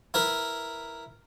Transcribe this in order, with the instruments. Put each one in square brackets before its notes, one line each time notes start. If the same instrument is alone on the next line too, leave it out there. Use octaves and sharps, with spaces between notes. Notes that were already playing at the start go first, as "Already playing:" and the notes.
[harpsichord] E4 A#4 B4